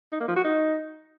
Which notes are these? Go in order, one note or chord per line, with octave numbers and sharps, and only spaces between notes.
D#4
A#3
F3
F#4
D#4